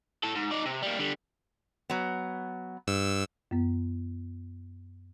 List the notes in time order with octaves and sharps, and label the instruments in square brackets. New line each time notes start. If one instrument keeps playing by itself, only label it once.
[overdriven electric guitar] A2 A4
G#2
D#4 D5
C3
G3 A#3
D3 G3
[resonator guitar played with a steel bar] F#3 B3
[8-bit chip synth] G2 E6
[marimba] F#2 B3